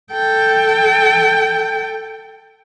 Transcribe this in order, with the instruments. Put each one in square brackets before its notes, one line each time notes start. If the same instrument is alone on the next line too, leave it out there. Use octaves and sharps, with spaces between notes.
[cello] A4 G5